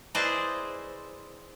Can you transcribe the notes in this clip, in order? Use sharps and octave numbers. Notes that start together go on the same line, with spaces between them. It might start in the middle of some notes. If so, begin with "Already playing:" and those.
E4 G#4 B4 C5 D5 D#5